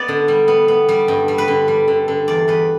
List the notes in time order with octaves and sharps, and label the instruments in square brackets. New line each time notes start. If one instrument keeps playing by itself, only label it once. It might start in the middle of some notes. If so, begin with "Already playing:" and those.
Already playing: [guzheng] B3 D5
D3
G3
B3
B3
G3
G2
G3
B4
D3
G3
D3
D3
E2 D5
E2 B4